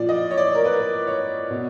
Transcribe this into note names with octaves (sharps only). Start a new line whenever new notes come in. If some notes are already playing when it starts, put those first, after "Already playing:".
Already playing: A#2 F3 D5
D#5
C#5
D5
A#4
B4
C#5
B2